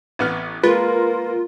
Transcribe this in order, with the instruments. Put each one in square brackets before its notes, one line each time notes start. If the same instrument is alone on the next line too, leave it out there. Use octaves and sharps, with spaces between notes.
[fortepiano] A1 B3 F6
[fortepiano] G#3 [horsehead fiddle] A#3 A#4 [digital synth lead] F4 [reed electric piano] B4